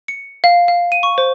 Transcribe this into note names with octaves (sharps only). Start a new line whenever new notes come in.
C#7
F5
F5
D#7
C#6
C5